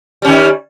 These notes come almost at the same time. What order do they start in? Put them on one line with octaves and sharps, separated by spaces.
G3 C#4 D#3